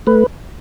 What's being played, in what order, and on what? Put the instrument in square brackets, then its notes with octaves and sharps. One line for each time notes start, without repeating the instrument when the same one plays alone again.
[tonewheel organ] A3 B4